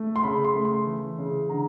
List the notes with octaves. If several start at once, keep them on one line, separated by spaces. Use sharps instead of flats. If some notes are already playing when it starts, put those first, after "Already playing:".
Already playing: A3
C6
C#3 B5
C6
A3
C6
E3
C#3
D3 A#5